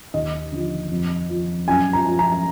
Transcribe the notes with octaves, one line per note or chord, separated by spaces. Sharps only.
D#2 D#5
D3 F3
F2
F3
F#2 G#5
A#5
F3
A#5